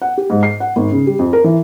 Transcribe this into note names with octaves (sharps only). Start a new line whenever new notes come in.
F#5
G4
G#2
C7
F#5
G#1
C#3
G3
F2
A#4
E3